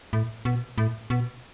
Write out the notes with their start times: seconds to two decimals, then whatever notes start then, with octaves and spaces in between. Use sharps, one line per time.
0.13 A2
0.45 B2
0.78 A2
1.10 B2